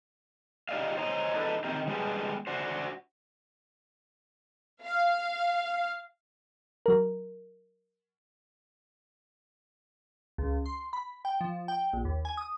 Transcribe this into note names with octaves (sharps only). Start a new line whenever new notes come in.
D#4 G4 D5 D#5 F5
C5 C#5 D#5 A#5
D4 D#4 A4 B4
C3 D#3 D#4 G4 A#4
G3 G#3 B3 D4 G4
D4 F#4 C5
F5
F#3 A#4
C#2
C6
B5
G5
F3
G5
A#1
D#2
G#5
D#6